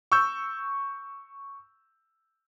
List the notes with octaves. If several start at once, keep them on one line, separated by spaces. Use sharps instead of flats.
C#6 E6 G6